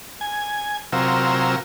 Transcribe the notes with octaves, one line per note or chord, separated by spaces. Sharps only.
G#5
C3 F#3 F4 A#4 E6